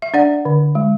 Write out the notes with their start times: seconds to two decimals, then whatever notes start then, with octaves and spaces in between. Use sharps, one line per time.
0.02 E5
0.14 D4 D5 F#5
0.45 D3
0.75 G#3